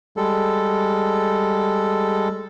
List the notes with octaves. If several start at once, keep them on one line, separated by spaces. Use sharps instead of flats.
G3 G#3 A4